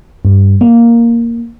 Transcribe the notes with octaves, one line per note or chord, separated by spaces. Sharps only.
G2
A#3